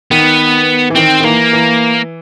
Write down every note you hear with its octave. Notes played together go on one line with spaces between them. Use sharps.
D#3 B3
E3
D#3 C4
D#3
E3 A#3
E3